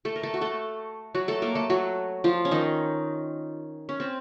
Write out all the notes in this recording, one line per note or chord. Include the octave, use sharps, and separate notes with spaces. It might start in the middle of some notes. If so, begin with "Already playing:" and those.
A3 A4
A#4
A3 A4
F#4
A3 A4
F#3 F#4
A3 A4
A#3 A#4
A3 A4
F#3 F#4
F3 F4
C#4
D#3 D#4
C#4
C4